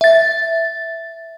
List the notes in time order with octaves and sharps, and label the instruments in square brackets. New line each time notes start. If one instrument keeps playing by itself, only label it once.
[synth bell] E5 A6